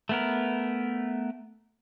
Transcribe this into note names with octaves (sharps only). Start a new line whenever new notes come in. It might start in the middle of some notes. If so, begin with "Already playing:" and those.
A3 B3 A#4